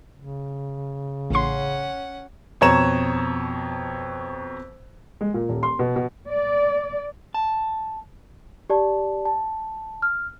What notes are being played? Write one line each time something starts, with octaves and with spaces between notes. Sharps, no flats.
C#3
A1 C#4 F#5 C6
F2 B2 C#5 A#5 E7
G#3
A#2
D#1
C6
B2
B2
D5
A5
G4 D5 A5
A5
F6